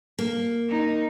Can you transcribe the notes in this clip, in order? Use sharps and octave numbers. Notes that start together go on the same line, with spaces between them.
A#3
D#4